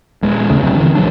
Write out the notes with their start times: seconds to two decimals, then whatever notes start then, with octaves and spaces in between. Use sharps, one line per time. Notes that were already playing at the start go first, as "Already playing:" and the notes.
0.22 D#1 G#3
0.49 E1 D#2 C#3 A3
0.61 D#1 C2 C3 F#3
0.77 D3 E3
0.95 A#1 E3 F#3 D4